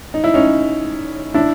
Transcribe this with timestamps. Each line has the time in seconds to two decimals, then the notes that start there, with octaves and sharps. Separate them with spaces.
0.14 D#4
0.24 E4
0.34 C#4 D#4
1.34 D4 E4